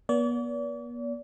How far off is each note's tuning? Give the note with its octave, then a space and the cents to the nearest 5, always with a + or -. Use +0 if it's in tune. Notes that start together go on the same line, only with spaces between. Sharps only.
B3 -40 D5 -40